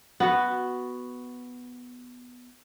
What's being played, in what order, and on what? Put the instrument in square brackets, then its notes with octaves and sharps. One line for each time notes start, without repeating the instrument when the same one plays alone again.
[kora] B3 F#4 B4